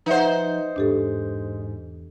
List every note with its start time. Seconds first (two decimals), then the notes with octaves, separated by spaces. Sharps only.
0.06 F3 D#4 B4 C5 E5 F#5
0.76 E2 G#2 D4 G4 A4